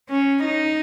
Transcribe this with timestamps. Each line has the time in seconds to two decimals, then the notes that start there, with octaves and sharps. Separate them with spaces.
0.09 C#4
0.45 D#4